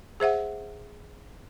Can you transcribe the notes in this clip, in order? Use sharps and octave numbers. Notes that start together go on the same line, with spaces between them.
G#4 C5 E5 F#5